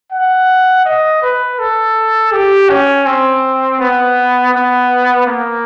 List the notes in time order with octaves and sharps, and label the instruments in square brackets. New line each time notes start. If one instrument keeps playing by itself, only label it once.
[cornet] F#5
D#5
B4
A4
G4
C#4
C4
B3
B3
A#3